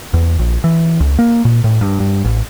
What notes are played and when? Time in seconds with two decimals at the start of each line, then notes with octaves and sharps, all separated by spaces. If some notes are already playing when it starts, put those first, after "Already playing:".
0.14 E2
0.39 A#1
0.64 E3
1.00 C#2
1.19 A#3
1.45 A#2
1.64 A2
1.81 G2
2.00 G2
2.24 A1